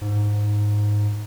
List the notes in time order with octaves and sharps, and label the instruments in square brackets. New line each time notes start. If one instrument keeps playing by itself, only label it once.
[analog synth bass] G#2